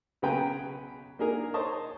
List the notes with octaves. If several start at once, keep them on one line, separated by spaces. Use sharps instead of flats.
B1 C#3 B4 G5 G#5 A#5
A#3 D4 D#4 G#4 A#4
C5 C#5 D#5 A5 C#6